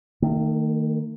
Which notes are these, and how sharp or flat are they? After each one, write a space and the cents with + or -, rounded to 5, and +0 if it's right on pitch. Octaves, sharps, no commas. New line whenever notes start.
D#3 +0 A3 +45